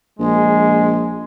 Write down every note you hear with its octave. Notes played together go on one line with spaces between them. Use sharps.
A#1 G#3